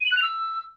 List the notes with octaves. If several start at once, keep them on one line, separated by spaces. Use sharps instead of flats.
D#7
F#7
F#6
F7
E6